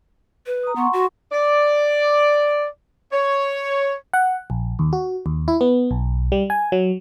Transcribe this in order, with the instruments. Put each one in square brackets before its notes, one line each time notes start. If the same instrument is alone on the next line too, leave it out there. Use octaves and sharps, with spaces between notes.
[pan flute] B4
[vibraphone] A#5 D#6
[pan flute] B3 [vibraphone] F#5 C6 C#6
[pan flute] F#4
[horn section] D5
C#5
[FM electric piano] F#5
A#1
D#2
F#4
D#2
E4
B3
B1
G3
G#5
F#3